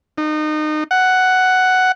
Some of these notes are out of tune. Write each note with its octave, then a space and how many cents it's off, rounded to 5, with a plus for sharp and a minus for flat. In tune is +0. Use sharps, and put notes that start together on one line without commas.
D#4 -30
F#5 +5